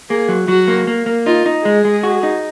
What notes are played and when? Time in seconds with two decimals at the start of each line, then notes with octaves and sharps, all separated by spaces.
0.10 A#3 G#4
0.29 F#3
0.48 F#3 F#4
0.68 A#3
0.87 A#3
1.06 A#3
1.26 D#4 F4
1.46 D#4
1.64 G#3 G#4
1.85 G#3
2.03 F#4
2.23 D#4